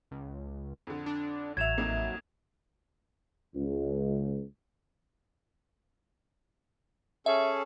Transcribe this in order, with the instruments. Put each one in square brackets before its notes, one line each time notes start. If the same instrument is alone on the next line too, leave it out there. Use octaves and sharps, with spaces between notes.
[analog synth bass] C#2
[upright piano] F2 D3
[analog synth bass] D4
[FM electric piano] A1 E5 [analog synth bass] F#3 [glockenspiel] G#6 E7 F7
[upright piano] F2 A#3 D#4
[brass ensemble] C#2
[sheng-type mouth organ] C#4 G#4 A4 [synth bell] E5